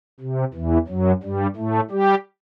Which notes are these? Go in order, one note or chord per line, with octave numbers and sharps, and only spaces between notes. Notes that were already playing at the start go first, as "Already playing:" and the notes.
C3
E2 E3
F#2 F#3
G2 G3
A2 A3
G3 G4